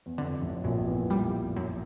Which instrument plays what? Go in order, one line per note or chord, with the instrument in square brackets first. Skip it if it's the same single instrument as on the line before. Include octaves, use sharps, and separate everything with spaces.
[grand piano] E2
[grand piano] F2 [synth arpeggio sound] D3
[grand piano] A1 A2
[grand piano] A#1 A#2 [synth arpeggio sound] F#2
[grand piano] E2 E3
[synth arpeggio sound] G3
F#2